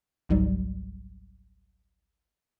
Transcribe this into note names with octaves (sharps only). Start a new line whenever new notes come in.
G#1 C#2 G#2 F#3 G3